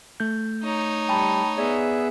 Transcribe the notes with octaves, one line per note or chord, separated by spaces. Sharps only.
A3 G6
D#4 C#5 A#5
G3 G5 A5 B5
B3 G#4 D5 E5